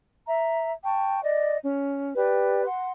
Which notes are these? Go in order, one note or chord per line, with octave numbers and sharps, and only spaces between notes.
E5 A#5
G5 A5 C#6
D5 D#5
C#4
G4 B4 D5 G5
F#5 C6